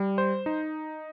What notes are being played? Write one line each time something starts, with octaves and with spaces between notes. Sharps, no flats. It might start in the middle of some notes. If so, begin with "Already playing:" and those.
Already playing: G3
C5
D#4